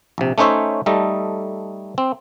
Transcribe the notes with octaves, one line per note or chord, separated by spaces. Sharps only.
A#1 C3
A3 C#4 D#4 C5 C#5 E5
G3 A3 D#4 A4 D#5
C4